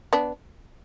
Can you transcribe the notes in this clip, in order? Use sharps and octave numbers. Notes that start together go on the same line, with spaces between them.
B3 D4